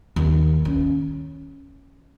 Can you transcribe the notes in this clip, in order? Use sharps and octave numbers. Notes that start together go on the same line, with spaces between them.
D#2
C#4